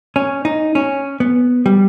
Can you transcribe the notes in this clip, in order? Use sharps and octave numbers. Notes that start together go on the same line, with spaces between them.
C#4
D#4
C#4
B3
G3